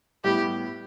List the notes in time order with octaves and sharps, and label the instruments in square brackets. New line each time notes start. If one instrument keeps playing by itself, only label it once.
[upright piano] A2 G3 B3 [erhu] G4